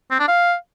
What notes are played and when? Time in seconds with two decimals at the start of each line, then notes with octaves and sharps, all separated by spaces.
0.11 C4
0.19 D4
0.28 F5